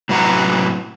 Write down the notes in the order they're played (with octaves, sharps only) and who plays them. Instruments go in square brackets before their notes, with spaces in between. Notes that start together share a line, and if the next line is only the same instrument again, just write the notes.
[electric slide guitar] A2 C3 F#3 B4 F#5 A#5